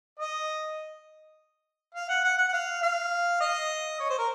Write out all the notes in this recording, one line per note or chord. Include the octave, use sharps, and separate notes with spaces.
D#5
F5
F#5
F#5
F#5
F#5
F5
F5
D#5
C#5
C5
A#4